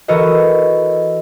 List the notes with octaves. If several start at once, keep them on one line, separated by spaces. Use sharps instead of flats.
E3 F#4 A4 A#4 D#5